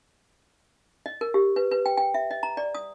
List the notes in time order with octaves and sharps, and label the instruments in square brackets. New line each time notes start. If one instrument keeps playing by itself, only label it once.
[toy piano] D#5
A#4
G4
B4
B4
G5
G5
E5
D#5
A#5
D5
D#6